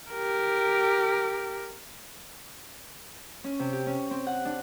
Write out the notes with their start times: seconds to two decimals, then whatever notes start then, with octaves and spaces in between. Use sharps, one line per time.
0.11 G4 A#4
3.44 C#4
3.59 C3
3.73 G4
3.87 C#4
4.11 C4
4.27 F#5
4.45 D4